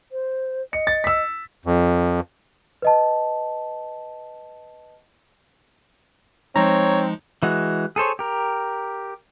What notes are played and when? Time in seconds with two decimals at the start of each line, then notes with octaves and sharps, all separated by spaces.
0.12 C5
0.73 D#5 C#7
0.87 A6
1.04 E6 B6
1.65 F2
2.82 B4 D#5 A5
6.56 F3 G#3 C4 D#4 C#5 A#5
7.43 E3 G#3 F#4
7.96 G#4 A4 C5 C#5
8.19 G4 A#4